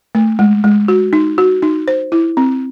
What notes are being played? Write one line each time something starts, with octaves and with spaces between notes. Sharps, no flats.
A3
G#3
G#3
F#4
D#4
F#4
D#4
C5
E4
C4